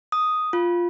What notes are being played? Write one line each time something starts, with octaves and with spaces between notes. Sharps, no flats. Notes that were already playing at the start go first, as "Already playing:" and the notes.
D#6
F4